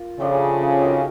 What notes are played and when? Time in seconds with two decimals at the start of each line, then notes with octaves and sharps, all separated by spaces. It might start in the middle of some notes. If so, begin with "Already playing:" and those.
Already playing: A#3 F4 A#4
0.19 C#3 F3 A3 D4 G4
0.81 C4 D#4 F#4 A#4